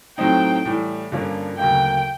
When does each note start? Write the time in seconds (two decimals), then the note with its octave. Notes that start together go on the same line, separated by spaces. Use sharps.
0.18 A2 F#3 A3 C4 D#4 G5
0.65 A2 E3 G3
1.12 G2 D3 F3 A#3 C#4
1.59 D2 C#3 F#3 A#3 G5